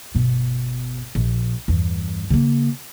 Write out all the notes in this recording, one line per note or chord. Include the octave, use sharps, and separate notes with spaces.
G1 B2
A#1
E2 G2
C#3 A#3